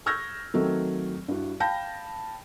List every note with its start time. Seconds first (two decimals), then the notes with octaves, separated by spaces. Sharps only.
0.06 C#6 E6 F6 G6 G#6 A#6
0.54 D#3 F#3 A3 C4
1.28 G2 E4 F#4
1.60 F5 G5 A5 B5 G6 A#6